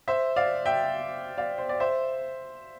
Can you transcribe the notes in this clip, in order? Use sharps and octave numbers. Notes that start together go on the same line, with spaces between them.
C5 E5
D5 F5
E5 G5
D5 F5
C5
D5
C5 E5